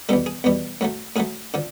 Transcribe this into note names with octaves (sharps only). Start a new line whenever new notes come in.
E2 B2 G3 A4
G#4
E2 B2 G3
A2 F#3 A3
A2 F#3 A3 G#4
D3 F3